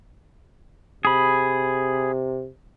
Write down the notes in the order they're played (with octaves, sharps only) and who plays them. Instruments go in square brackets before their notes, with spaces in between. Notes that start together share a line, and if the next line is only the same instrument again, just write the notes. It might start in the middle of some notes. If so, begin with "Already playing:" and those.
[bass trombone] C3 [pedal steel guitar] G#4 B5